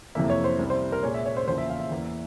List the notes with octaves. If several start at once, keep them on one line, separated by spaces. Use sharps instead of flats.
F2 C3 E3 A#3 E5
C#5
C5
C2 C3 G3
C5
A#4
A#2 G#3 C#5
E5
C#5
C5
E2 C#3 F3 A#3 C5
E5
F5
E5
E2 E3 A#3